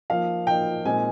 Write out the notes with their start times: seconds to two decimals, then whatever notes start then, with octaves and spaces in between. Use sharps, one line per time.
0.10 F3 A#3 D#4 F5
0.47 F3 A#3 D#4 G5
0.85 A#2 G#3 C4 D#4 G#5